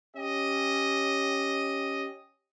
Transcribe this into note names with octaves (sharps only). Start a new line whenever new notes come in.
C#4 G4 D#5